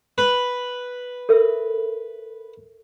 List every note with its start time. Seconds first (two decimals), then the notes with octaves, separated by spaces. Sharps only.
0.18 B4
1.29 A4 A#4 E5